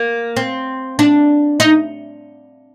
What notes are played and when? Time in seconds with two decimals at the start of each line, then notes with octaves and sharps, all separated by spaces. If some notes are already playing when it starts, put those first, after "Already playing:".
Already playing: A#3
0.36 C4
0.99 D4
1.60 D#4